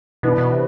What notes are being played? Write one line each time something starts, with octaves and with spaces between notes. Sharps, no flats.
B2 E3 B3 D4
B2
C3